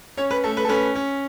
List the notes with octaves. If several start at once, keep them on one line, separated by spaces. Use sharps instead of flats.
C#4 C#5
B4
A3 A4
B4
A4
C#4 B4
C#4